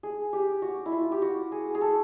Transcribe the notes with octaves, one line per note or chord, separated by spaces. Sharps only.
G#4
G4
F#4
E4
F4
G4
F#4
G#4
G#4
A4